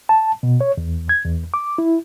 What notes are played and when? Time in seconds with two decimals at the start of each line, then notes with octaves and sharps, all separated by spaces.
0.09 A5
0.43 B2
0.61 C#5
0.78 E2
1.09 G#6
1.25 E2
1.54 D6
1.78 E4